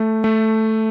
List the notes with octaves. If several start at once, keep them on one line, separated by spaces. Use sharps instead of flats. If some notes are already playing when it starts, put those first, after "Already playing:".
Already playing: A3
A3